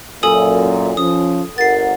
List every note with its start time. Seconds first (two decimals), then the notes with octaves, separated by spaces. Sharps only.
0.23 F#2 A#2 A4 G#5 D#6
0.97 F3 C#4 D#6
1.58 G1 A#4 F#5 A6 C7